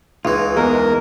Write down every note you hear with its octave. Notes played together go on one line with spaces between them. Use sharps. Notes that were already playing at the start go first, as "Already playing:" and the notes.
C#2 E3 D#4 F4
E2 G#3 A#4